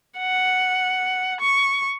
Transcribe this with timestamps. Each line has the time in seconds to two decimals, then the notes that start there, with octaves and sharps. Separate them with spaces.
0.19 F#5
1.41 C#6